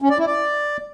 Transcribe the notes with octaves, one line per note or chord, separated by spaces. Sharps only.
C#4
D5
E4
D5